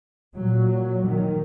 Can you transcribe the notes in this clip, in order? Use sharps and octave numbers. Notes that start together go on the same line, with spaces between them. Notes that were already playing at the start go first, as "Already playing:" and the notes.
A#2 F#3
D#3